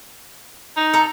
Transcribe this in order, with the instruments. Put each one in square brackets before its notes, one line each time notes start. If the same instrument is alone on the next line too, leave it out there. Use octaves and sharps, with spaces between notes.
[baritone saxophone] D#4
[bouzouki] A4 A#5